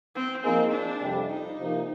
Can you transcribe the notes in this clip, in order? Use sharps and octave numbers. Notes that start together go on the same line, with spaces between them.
C4
F3 A#3 C4 D#4 G#4
D4
F2 C3 G3
D#4
C3 F3 A#3